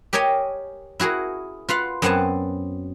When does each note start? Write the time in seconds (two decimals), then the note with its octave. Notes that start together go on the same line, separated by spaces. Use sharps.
0.13 G4 A#4 C#5 D#5 G5 G#5
1.00 E4 F#4 G#4 A#4
1.69 F4 B4 F5 F#5
2.02 F#2 B3 C4 F#5 G#5 A5